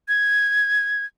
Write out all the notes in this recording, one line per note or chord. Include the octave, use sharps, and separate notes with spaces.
G#6